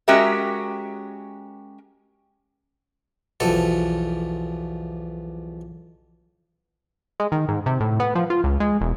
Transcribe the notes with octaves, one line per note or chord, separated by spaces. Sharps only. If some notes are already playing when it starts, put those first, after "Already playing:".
G#3 C#4 F#4 G4 A#4 E5
B1 E2 F3 A4
G#3
D#3
G#2
C3
A2
B3
F3
F4
C#2
G#3
E1